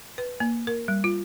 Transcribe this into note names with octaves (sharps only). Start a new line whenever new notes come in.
B4
A#3
A#4
G3
F4